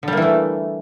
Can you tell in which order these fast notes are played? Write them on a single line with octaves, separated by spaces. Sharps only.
D3 G3 A#3 E3 A3